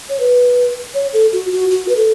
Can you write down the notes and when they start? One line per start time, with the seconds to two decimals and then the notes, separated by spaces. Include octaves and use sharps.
0.09 C#5
0.20 B4
0.94 C#5
1.13 A4
1.33 F#4
1.52 F#4
1.71 F#4
1.88 B4
1.96 A4